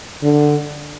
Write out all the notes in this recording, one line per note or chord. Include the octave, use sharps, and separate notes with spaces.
D3